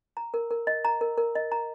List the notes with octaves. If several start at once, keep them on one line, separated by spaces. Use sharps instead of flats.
A#5
A#4
A#4
D#5
A#5
A#4
A#4
D#5
A#5